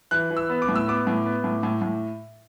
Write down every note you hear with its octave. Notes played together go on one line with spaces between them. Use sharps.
E3 F#6
E3
E6
B3
D6
A2
E6
B3 D6
A2
B3
A2
A2
A2